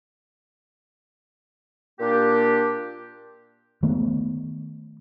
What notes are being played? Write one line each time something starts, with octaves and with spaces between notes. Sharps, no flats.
A#2 A#3 D4 G4
D#3 A3 B3